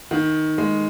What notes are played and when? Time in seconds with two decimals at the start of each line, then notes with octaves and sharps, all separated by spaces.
0.11 D#3
0.58 G#3